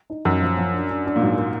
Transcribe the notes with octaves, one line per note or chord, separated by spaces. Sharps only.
D#4
F#2 D#4
F3
F3
D4
D4
D4
A#2
G#2 F#3
A#3